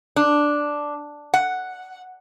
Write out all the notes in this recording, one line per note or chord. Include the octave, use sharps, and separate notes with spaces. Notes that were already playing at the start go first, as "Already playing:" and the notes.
D4
F#5